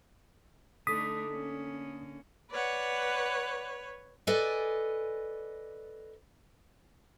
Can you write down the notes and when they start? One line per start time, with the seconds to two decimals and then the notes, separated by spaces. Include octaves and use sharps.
0.87 D3 A3 D4 D#4 A4 D#6 B6
1.29 A#3 C#4
2.51 B4 C#5 D5 F#5
4.27 A4 B4 D5 D#5 G#5